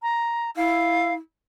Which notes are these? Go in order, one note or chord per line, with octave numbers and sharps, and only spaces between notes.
A#5
E4 F5